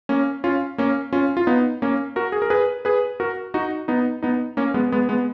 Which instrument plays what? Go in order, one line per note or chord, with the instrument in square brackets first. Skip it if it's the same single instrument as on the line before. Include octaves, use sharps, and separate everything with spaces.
[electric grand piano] A#3 C#4
C#4 F4
A#3 C#4
C#4 F4
F4
B3 D#4
A#3 C#4
F#4 A#4
G#4
A#4
G#4 B4
G#4 B4
F#4 A#4
D#4 F#4
B3 D#4
B3 D#4
A#3 C#4
G#3 B3
G#3 B3
G#3 B3